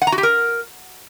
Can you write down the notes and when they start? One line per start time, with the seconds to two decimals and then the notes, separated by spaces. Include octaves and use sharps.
0.02 F#5
0.07 A#5
0.12 F#4
0.18 G4
0.23 A#4